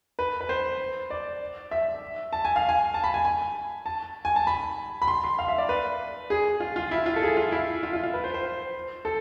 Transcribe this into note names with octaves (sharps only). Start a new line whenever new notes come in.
B4
B4
C5
D5
E5
A5
G#5
F5
G#5
A5
B5
G#5
G#5
A5
G#5
A5
B5
B5
C6
C6
F5
E5
D5
B4
G#4
F4
F4
E4
F4
A4
G#4
F4
E4
F4
F4
F4
B4
C5
C5
A4